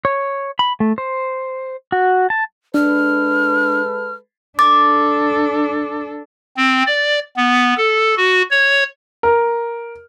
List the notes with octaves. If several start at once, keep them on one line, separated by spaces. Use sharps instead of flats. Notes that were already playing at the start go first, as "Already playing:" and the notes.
C#5
B5
A3
C5
F#4
A5
G#3 D4 A4 B4 F6
D4 A4 D6 A6
C4
D5
B3
A4
F#4
C#5
A#4